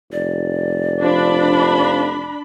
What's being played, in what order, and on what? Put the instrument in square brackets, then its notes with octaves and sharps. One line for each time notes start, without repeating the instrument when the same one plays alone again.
[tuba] F1 [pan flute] D5
[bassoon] F3 [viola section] D4 B5